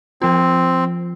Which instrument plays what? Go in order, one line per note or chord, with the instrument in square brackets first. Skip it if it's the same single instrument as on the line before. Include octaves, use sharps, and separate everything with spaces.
[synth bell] F3 F4 [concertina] C4